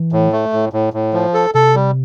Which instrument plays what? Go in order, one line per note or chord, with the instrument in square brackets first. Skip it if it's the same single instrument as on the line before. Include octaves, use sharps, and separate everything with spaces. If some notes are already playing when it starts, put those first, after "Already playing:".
Already playing: [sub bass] E3
[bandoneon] A2
A3
A2
A2
A2
F3
A4
[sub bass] C3 [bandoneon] A4
[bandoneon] G3